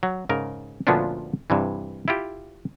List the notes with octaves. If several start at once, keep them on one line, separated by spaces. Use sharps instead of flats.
F#3
G#2 C#3 A#4
D2 A#2 F3 B3 C#4 D4
G2 C3 E3
E4 F4 G4